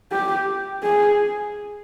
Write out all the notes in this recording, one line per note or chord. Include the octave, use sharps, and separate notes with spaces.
G4
G#4